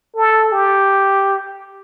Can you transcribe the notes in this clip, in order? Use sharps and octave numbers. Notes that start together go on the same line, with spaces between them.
A4
G4